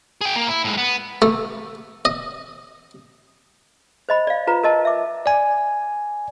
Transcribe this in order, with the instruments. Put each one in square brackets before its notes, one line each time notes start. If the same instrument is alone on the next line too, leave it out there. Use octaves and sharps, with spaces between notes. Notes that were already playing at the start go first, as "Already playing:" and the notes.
[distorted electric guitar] G#4 G5
A#3
E4
A2 G#3
B3
[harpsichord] A3
D#5
[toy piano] C5 D#5 B5
D5 F5
F4 B4 A#5
A#4 D#5 A5
E5 D6
[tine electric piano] D5 G#5